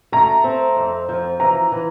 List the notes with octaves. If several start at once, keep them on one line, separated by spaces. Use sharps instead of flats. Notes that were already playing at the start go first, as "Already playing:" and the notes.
A3 A#5
C4
F2
F3
E3 A#5
E3